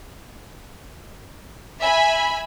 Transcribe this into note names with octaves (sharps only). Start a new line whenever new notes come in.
E5 G#5 B5